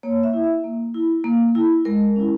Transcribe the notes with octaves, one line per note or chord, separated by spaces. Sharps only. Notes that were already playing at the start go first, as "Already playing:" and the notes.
A#3 C#5
E5
E4
E5
A#3
E4
A#3
E4
G#3 A#4
C#4 E4